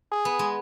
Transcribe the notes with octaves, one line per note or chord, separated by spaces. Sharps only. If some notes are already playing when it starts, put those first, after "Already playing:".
G#4
B3
G#3